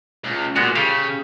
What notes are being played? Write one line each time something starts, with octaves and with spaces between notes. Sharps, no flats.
C#2
A#2 G#3 B3 F#4
C#3 G4 A4 F5